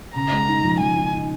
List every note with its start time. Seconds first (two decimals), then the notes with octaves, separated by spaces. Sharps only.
0.16 C#3 A#5
0.32 G#3
0.48 D#4
0.64 F3
0.80 F3 G#5
0.96 D#4
1.13 D#4